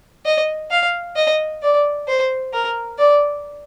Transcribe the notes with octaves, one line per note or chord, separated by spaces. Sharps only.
D#5
F5
D#5
D5
C5
A#4
D5